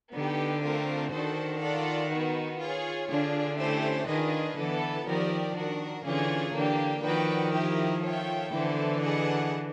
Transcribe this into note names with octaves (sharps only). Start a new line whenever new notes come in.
D3 B3 D#4 G4
A3 C4 F4 A#4
D#3 D4 F#4 A4 C5
F4 A4 D5 F#5
B3 D#4 F#4
F4 G#4 C#5
D3 D4 F4 G#4
A3 C#4 E4 G4 C5
D#3 D4 F4 G#4 B4 D#5
D3 E3 B3 E4 A4
D#3 F3 G4 A#4 D5
D#3 D4 F#4 A#4
D3 E3 C#4 F4 G#4 C#5
D3 E3 A#3 D4 G4
D#3 F3 F#4 B4 D5 G5
E4 G4 A#4
F4 A4 C#5 E5 G5
D3 E3 B3 E4 A4 C5
G#4 B4 D#5 F#5 A5